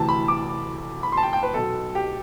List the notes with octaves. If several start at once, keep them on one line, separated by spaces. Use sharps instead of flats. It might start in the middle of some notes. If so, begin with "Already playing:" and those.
Already playing: D2 C3 E3 A5
B5
D6
B5
C6
A5
G5
G5
B4
B1 B2 A4
G4